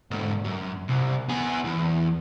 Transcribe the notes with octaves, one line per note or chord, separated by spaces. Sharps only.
G#2 D3
F#2
C2
B3 G#4
E2